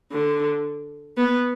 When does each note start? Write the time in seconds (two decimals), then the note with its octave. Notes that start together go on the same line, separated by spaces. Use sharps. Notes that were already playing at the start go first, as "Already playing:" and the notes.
0.12 D3
1.17 B3